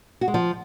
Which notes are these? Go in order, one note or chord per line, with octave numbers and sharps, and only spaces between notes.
F#4
G#3
F3